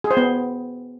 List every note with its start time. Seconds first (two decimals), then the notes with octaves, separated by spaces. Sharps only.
0.04 G#4
0.11 C5
0.17 B3